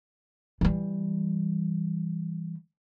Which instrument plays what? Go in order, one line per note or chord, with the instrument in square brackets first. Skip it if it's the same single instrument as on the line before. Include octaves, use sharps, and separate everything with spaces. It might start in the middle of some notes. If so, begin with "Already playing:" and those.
[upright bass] E3 G3